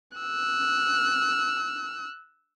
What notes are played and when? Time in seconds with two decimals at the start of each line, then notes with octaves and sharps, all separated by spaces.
0.18 E6 F#6